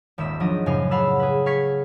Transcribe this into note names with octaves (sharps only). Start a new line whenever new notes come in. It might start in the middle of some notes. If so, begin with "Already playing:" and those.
D#1 G#1 G#3 E5 E7
F3 F#3 D4 D#5
F#2 A2 C#3 C5 F5 G#5
C#5 F5 F#5 A5 B5 E6
G#4 B4
F5 C#6 G#6 B6 C#7